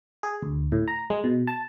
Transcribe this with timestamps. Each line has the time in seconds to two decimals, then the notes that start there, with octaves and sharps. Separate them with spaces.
0.23 G#4
0.42 D2
0.72 A2
0.88 A#5
1.10 G#3
1.24 B2
1.47 A5